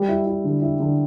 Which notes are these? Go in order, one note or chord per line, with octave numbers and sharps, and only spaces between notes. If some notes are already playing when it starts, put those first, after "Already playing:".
Already playing: G3
E4
E4
D3
E4
D3